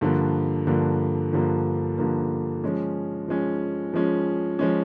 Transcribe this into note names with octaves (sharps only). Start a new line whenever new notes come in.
G2 D3 F3 A#3
G2 D3 F3 A#3
G2 D3 F3 A#3
G2 D3 F3 A#3
F3 G#3 C#4
F3 G#3 C#4
F3 G#3 C#4
F3 G#3 C#4